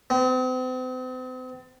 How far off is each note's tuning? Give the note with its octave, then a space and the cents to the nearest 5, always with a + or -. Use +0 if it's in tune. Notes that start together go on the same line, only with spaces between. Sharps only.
C4 -40